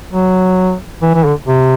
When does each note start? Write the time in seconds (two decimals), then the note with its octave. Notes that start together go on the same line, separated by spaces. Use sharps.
0.12 F#3
1.02 E3
1.14 E3
1.25 D3
1.48 C3